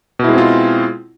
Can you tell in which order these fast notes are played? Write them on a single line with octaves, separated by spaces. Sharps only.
B2 E4 G#3 C4 F4